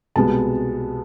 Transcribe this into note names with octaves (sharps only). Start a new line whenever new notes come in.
C2 B2 G#3 B3 A5